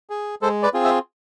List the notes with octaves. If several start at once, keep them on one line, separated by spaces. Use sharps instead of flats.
G#4
G#3 A4 C5
B4 D5
C4 F4 G#4
C5 E5